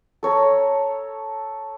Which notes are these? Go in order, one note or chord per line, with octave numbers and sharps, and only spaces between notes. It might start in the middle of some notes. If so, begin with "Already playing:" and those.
A4 C#5 A#5